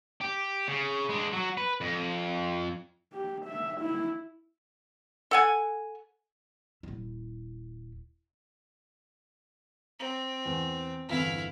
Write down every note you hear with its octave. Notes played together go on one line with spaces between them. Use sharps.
G4
C#3
G#3 D4
F#3
B4
F2
G4
E5
E4
A4 F#5 G#5
D#1 E4
C4
E2
G1 E2 C4 E4 F5